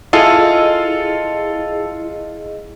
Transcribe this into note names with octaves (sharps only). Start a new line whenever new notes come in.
E4 F4 G#4 A4 D#5 F5